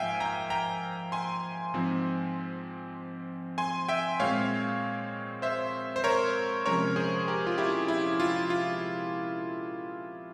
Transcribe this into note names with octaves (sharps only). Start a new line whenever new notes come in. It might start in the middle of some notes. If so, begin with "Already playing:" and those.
Already playing: G#2 F3 A#3 E5 F5 G5 G#5
G5 A#5
G5 A#5
G#5 C6
G#2 F3 C4
G#5 C6
E5 G5
A#2 G#3 C4 C#5 F5
C5 E5
C5
A#4 C#5
C3 F3 G#3 C#4 A#4 C#5
G#4 C5
G4 A#4
F4
E4 G4
E4
F4
F4